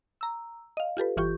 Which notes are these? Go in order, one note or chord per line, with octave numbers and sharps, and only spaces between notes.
A#5 E6
D#5 F5
F4 G4 A4 B4
G1 E3 F4 G4 C#6 G6